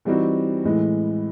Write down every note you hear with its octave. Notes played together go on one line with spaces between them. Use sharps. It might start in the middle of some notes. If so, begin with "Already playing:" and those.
E3 G3 C4 D#4 F#4
A2 E3 G#3